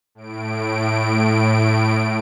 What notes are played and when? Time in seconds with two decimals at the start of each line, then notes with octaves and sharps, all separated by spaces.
0.15 A2 D7